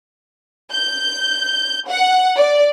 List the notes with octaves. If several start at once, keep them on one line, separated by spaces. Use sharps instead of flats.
G6
F#5
D5